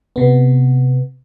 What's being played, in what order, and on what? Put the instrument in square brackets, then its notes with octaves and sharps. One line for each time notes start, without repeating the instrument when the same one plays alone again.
[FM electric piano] C3 B3